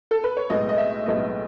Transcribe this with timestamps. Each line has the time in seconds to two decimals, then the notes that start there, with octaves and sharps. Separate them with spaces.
0.11 A4
0.24 B4
0.37 C#5
0.50 B1 A2 G#3 B3 D#5
0.69 D#5
0.77 E5
1.06 B1 A2 G#3 B3 D#5